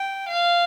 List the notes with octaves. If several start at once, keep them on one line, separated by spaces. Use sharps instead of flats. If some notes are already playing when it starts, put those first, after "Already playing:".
Already playing: G5
F5